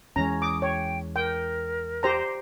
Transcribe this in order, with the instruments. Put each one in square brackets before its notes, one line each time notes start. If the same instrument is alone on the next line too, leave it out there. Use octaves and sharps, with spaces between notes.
[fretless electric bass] E2 E3 G#3 [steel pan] C#4 A#5
[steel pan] D6 [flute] D#6
[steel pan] C#5 [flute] G5
[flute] A#4 [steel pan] G5
[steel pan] G4 C5 A#5